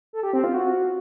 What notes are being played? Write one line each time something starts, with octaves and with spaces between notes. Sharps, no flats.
A4
G4
C4
F4
F#4